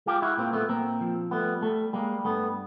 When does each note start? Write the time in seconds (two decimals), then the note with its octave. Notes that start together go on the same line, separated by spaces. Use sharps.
0.06 G#3 F4 G4
0.22 E4 F#4
0.38 A#2 A#3 C4
0.53 A3 B3
0.69 A#2 A#3 C4
1.01 F3
1.31 G3 A3 B3
1.62 G3 A3
1.93 G3 G#3 A#3
2.25 G2 A3 B3